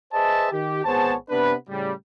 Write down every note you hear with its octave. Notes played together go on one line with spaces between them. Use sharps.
G#4 B4 C5 D#5 E5 A5
D#3 G4
G#1 B3 G#4 C5 C#5 A5
C3 B3 D4 B4
A2 C#3 G3